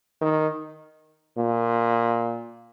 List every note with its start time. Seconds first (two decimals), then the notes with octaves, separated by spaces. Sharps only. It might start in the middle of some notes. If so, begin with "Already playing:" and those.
0.21 D#3
1.38 A#2